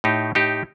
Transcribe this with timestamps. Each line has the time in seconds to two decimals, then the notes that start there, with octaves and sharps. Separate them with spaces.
0.04 A2 D#4 G4
0.35 A2 D#4 G4